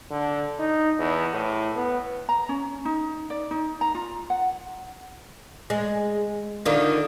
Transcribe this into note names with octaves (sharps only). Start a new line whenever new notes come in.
D3
D#4
E2
A2
B3
A#5
C#4
D#4
D5
D#4
A#5
F4
F#5
G#3
D3 D#3 F4